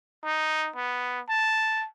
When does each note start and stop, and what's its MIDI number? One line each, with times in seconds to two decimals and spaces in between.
0.24 0.70 63
0.76 1.20 59
1.29 1.86 81